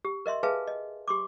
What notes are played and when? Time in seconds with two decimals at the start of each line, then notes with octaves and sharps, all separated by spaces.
0.05 G4
0.26 A#4 D#5 E5 C6
0.43 G#4 B4 E5 F5 G#5 A5
0.68 D#5
1.08 G4 C6 D6